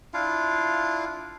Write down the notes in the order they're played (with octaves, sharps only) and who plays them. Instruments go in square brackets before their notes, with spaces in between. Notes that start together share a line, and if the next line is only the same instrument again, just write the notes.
[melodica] D4 E4 F4 F5